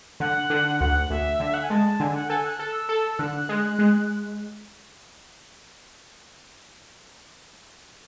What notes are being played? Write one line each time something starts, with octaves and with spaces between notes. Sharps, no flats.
D3 F#5
D3
D2 F#5
D2 E5
D3
E5
F#5
G#5
G#3 A5
D3 G#5
F#5
A4 G#5
F#6
A4 E6
A4
D3 F#6
G#3
G#3